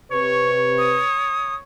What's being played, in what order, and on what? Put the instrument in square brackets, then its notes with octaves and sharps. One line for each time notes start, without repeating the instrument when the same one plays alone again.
[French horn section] C3 B4 [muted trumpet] C#5 [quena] C#6
[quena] D#6